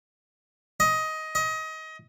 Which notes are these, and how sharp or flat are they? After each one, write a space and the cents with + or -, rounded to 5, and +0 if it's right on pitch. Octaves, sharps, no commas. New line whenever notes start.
D#5 +15
D#5 +25